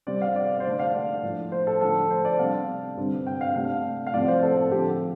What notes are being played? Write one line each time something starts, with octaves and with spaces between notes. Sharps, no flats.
C3 G3 C4 D5
F5
D5
C5
D3 A3 D4 D5
F5
D5
A2 F3 A3 D4
C5
A4
D3 F3 A3 D4 A4
C5
D5
C3 G3 D4 F5
G2 D3 G3 C4
G5
F5
C3 A3 D4 F5
F5
A2 F3 A3 C4 D5
C5
A4
A4
D3 F3 C4 G4